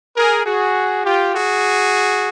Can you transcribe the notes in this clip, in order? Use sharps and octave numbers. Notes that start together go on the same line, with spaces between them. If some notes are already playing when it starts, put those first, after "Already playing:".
G#4 A#4
F#4 G#4
F4 G4
F#4 G#4